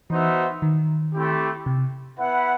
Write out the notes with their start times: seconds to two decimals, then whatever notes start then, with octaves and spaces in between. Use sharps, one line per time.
0.10 E3 B3 D#4 F#4 C5 E5
0.62 D#3
1.13 A3 C4 E4 G4
1.66 C3
2.18 B3 E4 B4 F#5